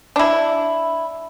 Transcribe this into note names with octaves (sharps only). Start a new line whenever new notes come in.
D4 E4